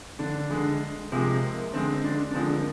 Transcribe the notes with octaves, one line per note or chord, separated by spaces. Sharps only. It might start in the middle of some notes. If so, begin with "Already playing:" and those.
D3 D4
D3 G#3
C3 F3 G#3 C4
A#3
D3 G#3 C4
D3 D4
D4
D3 F3 G#3 C4
A#3